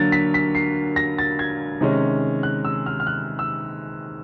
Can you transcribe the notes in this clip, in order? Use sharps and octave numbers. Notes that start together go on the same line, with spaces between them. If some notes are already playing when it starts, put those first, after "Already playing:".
Already playing: D3 F#3 A#3 A6
B6
B6
C7
A#6
A6
G#6
C3 D#3 G#3 C#4
F#6
E6
F6
F6
F#6
E6